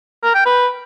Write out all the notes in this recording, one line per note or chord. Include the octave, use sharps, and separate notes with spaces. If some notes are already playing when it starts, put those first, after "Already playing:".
A#4
G5
B4